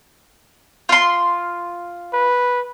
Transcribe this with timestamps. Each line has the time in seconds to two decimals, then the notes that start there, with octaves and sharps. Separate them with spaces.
0.89 F4 C6
2.13 B4